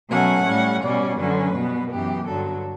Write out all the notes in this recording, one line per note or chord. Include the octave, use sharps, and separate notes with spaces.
B2 F#3 A3 C#4 F#5
A2 G3 C#4
B2 G3 C#4 D5
F#2 D3 F#3 C#4 B4
B2 G3 B3
F#2 E3 B3 G4
G2 D3 F#3 A4